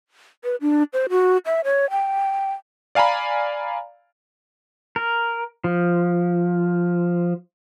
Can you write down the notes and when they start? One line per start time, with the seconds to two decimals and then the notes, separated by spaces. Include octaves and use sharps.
0.44 B4
0.61 D4
0.93 C5
1.10 F#4
1.46 E5
1.64 C#5
1.91 G5
2.95 D5 F5 G#5 A#5 B5
4.96 A#4
5.64 F3